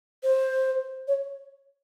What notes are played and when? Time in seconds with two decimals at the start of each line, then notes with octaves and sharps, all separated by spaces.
0.23 C5
1.08 C#5